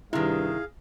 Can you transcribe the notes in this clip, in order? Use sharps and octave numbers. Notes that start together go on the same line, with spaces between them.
G2 C3 D#3 E4 G#4 F5